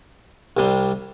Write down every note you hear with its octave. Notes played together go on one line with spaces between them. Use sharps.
C2 C3 G3